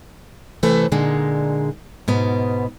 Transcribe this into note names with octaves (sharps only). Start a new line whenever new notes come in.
C3 E3 A3 A4 B4 C5
A#2 D3 G#3 D#4
G#2 B2 B3